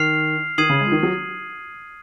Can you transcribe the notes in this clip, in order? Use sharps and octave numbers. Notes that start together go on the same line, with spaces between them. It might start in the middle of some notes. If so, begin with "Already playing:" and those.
Already playing: D#3 F6 C7 F7
D#3 D#6 G#6 C7 D#7 F#7
C#3
G#3
F3
D#3
F#3